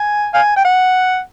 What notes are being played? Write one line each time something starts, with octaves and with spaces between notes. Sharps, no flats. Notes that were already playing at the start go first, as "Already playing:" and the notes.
Already playing: G#5
F5 G#5
G5
F#5